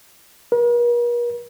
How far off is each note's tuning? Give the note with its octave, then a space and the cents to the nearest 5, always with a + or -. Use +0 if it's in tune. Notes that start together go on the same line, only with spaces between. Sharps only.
A#4 +45